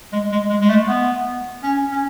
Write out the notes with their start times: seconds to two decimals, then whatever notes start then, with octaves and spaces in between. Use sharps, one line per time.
0.13 G#3
0.32 G#3
0.50 G#3
0.61 G#3
0.69 A3
0.88 B3
1.63 C#4
1.92 C#4